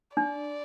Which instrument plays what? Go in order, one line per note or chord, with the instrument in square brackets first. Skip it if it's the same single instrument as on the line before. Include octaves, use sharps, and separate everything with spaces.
[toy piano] D4 [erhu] D5